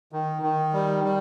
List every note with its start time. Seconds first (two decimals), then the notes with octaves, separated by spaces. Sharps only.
0.12 D#3
0.42 D#3
0.73 G3
1.04 G3